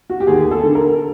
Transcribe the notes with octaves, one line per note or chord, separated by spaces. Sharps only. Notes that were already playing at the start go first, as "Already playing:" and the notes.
F#4
G4
D#2 G#4
A4
D3
A#4